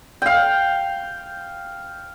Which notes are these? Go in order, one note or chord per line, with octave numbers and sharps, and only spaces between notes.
F5 G5